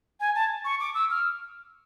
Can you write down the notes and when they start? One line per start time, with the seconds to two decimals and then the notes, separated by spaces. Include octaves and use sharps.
0.20 G#5
0.35 A5
0.65 C#6
0.80 D6
0.95 E6
1.10 F6